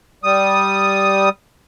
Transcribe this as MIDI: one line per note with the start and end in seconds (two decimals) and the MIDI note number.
0.24 1.29 55
0.24 1.29 87